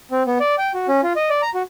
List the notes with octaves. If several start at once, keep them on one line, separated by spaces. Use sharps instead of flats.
C4
B3
D5
G5
F#4
C#4
F4
D#5
D5
A#5
F#4